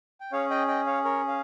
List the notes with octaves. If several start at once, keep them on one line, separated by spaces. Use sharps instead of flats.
G5
C#4 G#4 C#5 F5
D#5 G5
D#5 G5
C#5 F5
A#4 C#5
F5